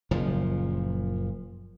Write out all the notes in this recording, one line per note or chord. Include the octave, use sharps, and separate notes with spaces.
F#1 A#2 F3